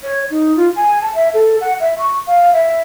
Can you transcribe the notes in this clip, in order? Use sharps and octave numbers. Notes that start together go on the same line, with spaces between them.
C#5
D#4
F4
G#5
A5
E5
A4
F#5
E5
C#6
F5
E5